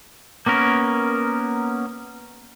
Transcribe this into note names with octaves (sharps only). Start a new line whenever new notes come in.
A#3 B3 C#4 A#4